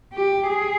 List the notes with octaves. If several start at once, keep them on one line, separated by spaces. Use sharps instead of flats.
G4
G#4